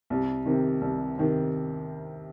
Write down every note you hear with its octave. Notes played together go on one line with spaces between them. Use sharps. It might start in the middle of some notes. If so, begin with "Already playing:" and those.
C2
C3 D#3
C2
C3 D#3